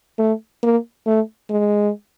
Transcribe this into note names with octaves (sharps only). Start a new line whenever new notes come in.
A3
A#3
A3
G#3